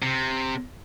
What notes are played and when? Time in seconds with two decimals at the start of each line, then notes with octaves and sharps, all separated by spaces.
0.03 C3